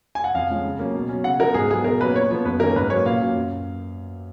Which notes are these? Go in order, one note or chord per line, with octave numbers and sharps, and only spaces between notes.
G#5
F#5
F2 F5
F3 G#3 C#4
C#3
F#3 A#3 C#4
B2
F#3 C#4
C#3 F#5
F3 B3 A#4
G#2 G#4
F#3 B3 G#4
B2 A#4
F#3 A#3 C#4 B4
A#2 C#5
F3 B3
F#2 B4
D#3 A#3 C#4 A#4
G#2 B4
F#3 A#3 C#4 C#5
A#2 F5
F#3 C#4
F#2